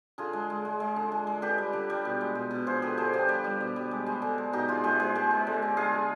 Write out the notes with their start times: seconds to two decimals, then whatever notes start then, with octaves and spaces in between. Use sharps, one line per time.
0.18 D3 F4 G#4
0.33 G#3
0.50 G#3
0.65 G#3
0.80 G#3
0.96 D3
1.12 G#3
1.27 G#3
1.42 D3 G4 B4
1.58 G3
1.73 D3
1.90 G3
2.05 B2
2.21 G#3
2.35 B2
2.51 B2
2.67 F3 G#4 C5
2.82 D3 G4 B4
2.97 D3 G#4 C5
3.13 F3 G4 B4
3.28 G3 G4 B4
3.44 G3
3.61 B2
3.76 G3
3.91 G#3
4.06 G#3
4.22 D3
4.38 G#3
4.53 B2 D#4 G4
4.68 G#3 F4 G#4
4.84 G#3 G4 B4
5.00 G#3 G#4 C5
5.15 G#3 G4 B4
5.31 G#3
5.47 D3
5.62 D3
5.77 G#3 F4 G#4
5.93 G#3